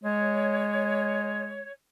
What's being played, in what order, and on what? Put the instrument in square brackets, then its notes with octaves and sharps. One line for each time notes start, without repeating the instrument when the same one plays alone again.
[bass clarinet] G#3 [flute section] C#5